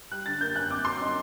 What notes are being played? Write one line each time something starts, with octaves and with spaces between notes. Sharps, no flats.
G3 F#6
D3 A6
A#3 G6
F#2 F#6
C4 D6
F#3 C6
D#4